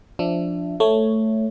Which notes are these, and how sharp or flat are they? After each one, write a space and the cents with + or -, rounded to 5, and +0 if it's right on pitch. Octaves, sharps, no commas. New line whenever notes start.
F3 +0 D4 -5 E5 +20
A3 +5 C#5 +0